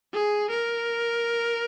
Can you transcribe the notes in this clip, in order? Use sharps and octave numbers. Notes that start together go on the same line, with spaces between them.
G#4
A#4